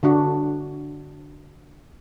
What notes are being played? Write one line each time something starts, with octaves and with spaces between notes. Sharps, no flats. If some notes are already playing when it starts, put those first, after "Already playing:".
D3 D4 F#4